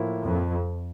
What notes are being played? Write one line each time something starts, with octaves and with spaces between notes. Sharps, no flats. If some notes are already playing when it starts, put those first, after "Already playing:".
Already playing: A2 F3 A#3 E4
F2